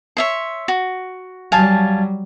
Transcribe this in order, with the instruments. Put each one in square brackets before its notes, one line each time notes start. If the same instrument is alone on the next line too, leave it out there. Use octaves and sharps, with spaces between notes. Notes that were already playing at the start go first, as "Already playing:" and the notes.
[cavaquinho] C#5 E5 C6
F#4
[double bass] F#3 G3 [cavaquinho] F5 G#5 A5